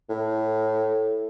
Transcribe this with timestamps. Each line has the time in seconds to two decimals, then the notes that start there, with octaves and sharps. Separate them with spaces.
0.09 A2